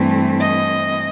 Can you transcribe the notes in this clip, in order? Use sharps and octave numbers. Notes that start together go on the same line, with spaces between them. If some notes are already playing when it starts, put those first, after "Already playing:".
Already playing: G2 E3 A3 C4
D#5